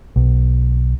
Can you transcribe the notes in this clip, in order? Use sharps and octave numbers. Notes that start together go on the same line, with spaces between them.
B1